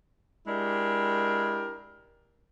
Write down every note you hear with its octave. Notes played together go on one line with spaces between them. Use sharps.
G#3 D4 E4 G4 A#4